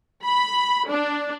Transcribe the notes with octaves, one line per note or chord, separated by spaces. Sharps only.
B5
D4